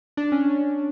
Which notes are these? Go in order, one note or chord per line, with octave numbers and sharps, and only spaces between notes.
D4
C#4
C#4